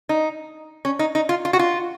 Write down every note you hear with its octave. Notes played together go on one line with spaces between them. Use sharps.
D#4
C#4
D#4
D#4
F4
F4
F#4
F4